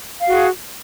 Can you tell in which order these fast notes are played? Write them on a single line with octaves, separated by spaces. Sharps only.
F5 F#4 G#4